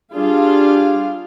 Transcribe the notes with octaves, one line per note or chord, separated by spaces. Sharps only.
G3 D4 F4 G#4 F5